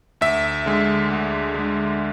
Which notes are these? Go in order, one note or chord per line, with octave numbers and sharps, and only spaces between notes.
D2 E5
D3 G#3
D2
D3 G#3